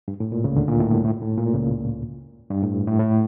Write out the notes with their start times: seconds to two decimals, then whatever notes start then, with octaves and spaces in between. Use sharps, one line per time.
0.08 G2
0.20 A2
0.32 A#2
0.44 C#2 C#3
0.56 D2 D3
0.68 A#2
0.81 A2
0.93 G2
1.05 A2
1.22 A2
1.37 A#2
1.54 C#2 C#3
2.51 G2
2.63 A2
2.87 A2
2.99 A2